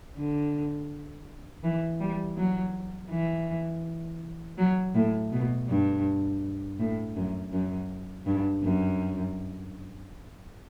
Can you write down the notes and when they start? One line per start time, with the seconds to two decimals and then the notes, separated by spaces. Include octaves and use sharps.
0.16 D3
1.63 E3
2.00 G3
2.37 F#3
3.10 E3
4.58 F#3
4.95 A2
5.32 B2
5.68 G2
6.79 A2
7.16 F#2
7.52 F#2
8.26 G2
8.63 F#2